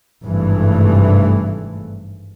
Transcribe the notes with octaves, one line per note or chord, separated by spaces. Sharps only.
G#1 G2 C3 E3 A3